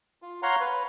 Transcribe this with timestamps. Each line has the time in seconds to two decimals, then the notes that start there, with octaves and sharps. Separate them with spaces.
0.22 F4
0.43 C#5 F5 F#5 A#5 C6
0.61 B4